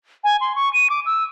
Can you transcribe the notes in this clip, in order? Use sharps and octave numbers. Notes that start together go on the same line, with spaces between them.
G#5
C6
C#6
D#7
D6
E6